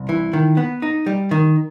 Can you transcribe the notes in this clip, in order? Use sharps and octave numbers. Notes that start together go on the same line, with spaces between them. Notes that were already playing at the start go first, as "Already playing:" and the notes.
Already playing: C2
E3
D#3
B3
D#4
G3
D#3